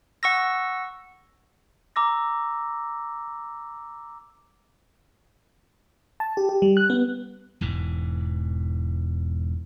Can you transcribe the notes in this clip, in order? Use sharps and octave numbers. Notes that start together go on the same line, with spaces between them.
F#5 C#6 E6 A#6
A#5 D6 E6 A#6
A5
G4
G4
G3
F#6
B3
E1 G#2 E3